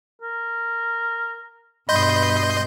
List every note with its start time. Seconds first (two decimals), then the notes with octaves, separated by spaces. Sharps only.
0.22 A#4
1.89 G2 B2 D#5 B5 C6 G6